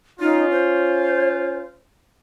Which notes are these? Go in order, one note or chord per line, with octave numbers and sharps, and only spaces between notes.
C#4 D#4 F4
C5